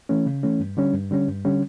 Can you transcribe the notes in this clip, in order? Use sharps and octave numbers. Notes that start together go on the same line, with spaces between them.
E3 A3 C#4
C#3
E3 A3 C#4
G2
D3 G3 C#4
G2
D3 G3 C#4
G2
D3 G3 C#4